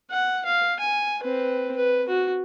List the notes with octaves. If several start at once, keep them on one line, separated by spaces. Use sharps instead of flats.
F#5
F5
G#5
C4 B4
B4
F#4